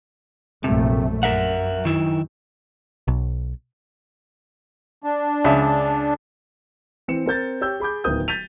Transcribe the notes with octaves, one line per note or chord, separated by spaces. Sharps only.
A#1 F#2 C3 A3
F#2 A#4 E5 F#5
D#3 E4
B1
D4
C#2 E5
E3 C4 C5 C#7 E7
C4 A#4 G6 A6
G4 C#5 E6 G6
G#4 B5 D6 G6
D1 D#3 B3 A#4 D#6 G6
G6 A6 B6 D#7 F7